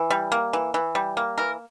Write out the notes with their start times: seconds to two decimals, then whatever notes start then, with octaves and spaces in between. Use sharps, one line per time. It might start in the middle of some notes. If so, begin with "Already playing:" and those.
Already playing: E3
0.10 G3
0.32 A#3
0.53 E3
0.74 E3
0.95 G3
1.17 A#3
1.38 E3 A#4